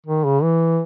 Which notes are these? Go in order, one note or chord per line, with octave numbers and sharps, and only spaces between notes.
D#3
C#3
E3